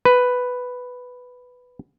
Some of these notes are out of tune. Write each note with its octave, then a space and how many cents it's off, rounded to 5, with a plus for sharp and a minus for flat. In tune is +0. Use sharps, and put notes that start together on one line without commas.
B4 +5